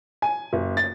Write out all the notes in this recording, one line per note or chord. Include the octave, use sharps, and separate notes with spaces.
G#5
F#1
A6